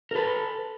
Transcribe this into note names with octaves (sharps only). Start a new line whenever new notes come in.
A#4
A4 B4